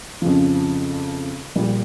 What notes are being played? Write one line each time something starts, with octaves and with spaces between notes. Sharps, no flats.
F2 C#3 F3
A#1 A#2 G3